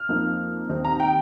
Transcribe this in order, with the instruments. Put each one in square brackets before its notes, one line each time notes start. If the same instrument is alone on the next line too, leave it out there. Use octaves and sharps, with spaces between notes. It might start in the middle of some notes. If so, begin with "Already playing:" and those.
Already playing: [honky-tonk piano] F6
F2 F3 A#3 D#4
D#2 D#3 C4 D#4
A#5
G5